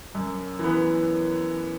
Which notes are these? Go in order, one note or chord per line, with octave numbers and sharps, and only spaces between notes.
F#2
E3 B3